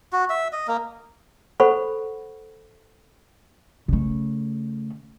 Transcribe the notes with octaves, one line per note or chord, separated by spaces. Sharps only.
F#4
E5
D#5
A#3
A4 C5 F#5 B5 C#6
C#3 A3